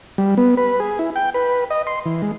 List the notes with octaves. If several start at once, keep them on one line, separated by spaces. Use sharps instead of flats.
G3
B3
B4
G#4
E4
G5
B4
D#5
C6
E3
G#3